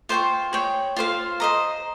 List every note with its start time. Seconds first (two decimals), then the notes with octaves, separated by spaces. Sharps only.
0.09 F4 C5 G5 C#6
0.53 G#4 C#5 G5
0.96 F4 C5 F5
1.40 C5 D#5 A#5